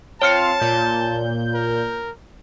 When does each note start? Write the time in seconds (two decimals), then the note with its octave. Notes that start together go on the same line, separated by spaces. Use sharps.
0.22 C4 F4 C#5 F5 A5 F6 C#7
0.60 A#2 G6
1.54 A#4